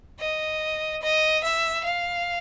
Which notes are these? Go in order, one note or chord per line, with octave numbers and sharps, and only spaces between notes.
D#5
D#5
E5
F5